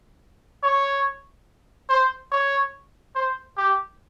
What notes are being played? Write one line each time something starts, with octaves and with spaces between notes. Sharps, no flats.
C#5
C5
C#5
C5
G4